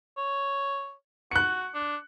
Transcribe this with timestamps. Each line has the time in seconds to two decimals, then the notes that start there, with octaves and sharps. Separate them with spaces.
0.17 C#5
1.31 F#4 F#6 C#7
1.74 D4